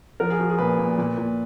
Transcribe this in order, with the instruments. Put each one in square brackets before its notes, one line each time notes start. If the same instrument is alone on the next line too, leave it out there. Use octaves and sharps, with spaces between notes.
[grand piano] F3 A#4
G#4
F3 F#4
G#4
A#2 B4
A#2
A#2
A#2